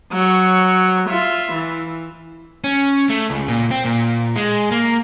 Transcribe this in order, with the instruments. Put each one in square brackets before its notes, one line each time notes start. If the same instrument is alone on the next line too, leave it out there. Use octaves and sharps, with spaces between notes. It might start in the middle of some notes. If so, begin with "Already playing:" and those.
[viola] F#3 C#5
F4 E5
E3
[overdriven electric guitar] C#4
A3
C#2
A#2
C4
A#2
G#3
A#3